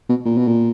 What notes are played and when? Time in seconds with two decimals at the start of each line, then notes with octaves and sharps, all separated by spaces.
0.09 B2
0.25 A#2
0.37 B2
0.48 A#2